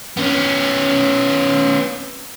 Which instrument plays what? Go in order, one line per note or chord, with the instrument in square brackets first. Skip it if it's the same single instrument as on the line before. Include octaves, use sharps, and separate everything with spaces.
[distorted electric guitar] B3 C#4